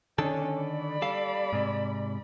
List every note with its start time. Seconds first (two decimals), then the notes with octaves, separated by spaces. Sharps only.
0.19 D3 D#3 C#4 D4 A4
0.56 D5 B5
1.02 G3 A4 F5
1.53 G#2 C3